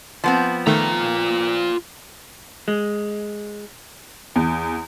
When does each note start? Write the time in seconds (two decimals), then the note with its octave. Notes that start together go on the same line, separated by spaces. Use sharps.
0.24 F3 B3 C4
0.67 D#3 A3 F4 A#5
2.68 G#3
4.36 E2